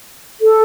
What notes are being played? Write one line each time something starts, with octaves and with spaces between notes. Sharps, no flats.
A4